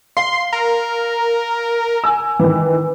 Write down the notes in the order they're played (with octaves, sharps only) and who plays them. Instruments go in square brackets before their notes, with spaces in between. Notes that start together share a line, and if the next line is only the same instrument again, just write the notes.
[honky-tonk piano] F5 [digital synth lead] C6
[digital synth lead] A#4
[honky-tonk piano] G#5 E6
D#3 E3